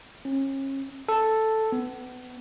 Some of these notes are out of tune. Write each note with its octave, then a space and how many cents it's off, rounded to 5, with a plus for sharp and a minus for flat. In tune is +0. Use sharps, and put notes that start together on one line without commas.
C#4 -35
A4 +0
B3 +25